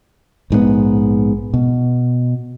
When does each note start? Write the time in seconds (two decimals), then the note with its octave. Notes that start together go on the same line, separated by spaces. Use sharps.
0.50 A#1 G#2 B2 B3
1.54 B2